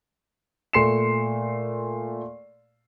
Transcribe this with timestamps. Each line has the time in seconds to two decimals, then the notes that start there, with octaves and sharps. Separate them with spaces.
0.73 A#2 A3 C6 C7 C#7 E7